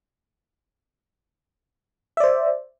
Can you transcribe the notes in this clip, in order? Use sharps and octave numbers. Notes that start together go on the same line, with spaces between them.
C5 D5 E5